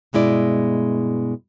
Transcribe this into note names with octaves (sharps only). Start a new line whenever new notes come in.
G2 B2 G#3 E4 D5